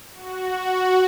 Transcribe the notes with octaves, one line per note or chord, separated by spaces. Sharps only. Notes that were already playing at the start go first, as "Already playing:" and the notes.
F#4